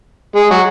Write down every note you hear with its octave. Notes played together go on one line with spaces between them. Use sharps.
G#3
F#3